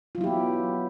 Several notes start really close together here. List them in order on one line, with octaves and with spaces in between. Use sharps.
F4 F#3 E4 G4 B3